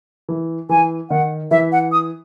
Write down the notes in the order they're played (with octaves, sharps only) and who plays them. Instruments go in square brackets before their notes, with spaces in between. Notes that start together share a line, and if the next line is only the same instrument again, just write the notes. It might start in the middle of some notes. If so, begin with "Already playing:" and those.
[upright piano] E3
[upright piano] E3 [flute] G#5
[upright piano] D#3 [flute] F#5
[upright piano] E3 [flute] E5
[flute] F#5
D#6